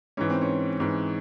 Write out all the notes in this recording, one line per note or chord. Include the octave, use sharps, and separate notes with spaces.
G#2 E3 C#4
C4
C#4
G#2 E3